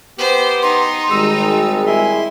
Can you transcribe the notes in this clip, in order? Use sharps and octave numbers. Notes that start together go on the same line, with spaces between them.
B3 G4 C5
D#4 C6
G#1 G3 G#3 A#5 E6
E4 E5 G#5 C6